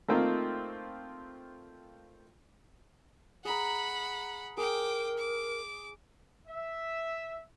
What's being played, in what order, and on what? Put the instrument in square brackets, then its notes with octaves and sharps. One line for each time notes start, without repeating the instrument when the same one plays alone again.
[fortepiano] A3 A#3 C4 D#4 F4
[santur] G#4 A#5 [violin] F#5 B5
[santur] G#4 [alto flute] A#4 [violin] G5 D6
[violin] D6
[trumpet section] E5